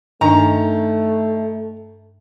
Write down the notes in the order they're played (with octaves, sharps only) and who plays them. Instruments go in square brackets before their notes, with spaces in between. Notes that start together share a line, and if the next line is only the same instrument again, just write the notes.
[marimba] G2 D4 [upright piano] D#3 [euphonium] A3 [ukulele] A#5